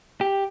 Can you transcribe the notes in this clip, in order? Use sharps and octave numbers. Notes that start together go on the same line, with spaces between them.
G4